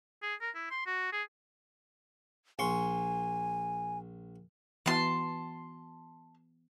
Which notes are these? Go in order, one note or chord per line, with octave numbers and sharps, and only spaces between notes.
G#4
A#4
E4
C6
F#4
G#4
A#1 G#5 C6 C#6
E3 B3 F#4 A5 C6